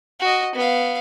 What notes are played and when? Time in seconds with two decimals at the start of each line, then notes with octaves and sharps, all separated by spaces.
0.20 F#4 D#5
0.55 B3 F5